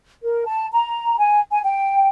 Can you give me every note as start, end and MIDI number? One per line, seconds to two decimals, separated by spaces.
0.24 0.44 70
0.46 0.67 81
0.73 1.16 82
1.18 1.39 80
1.51 1.60 80
1.65 2.08 79